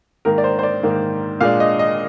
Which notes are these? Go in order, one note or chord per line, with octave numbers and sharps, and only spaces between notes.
G#2 D#3 A#3 A#4
D5
C5
C5
D5
G#2 D#3 A#3
A#2 G#3 D4 F5
D#5
D#5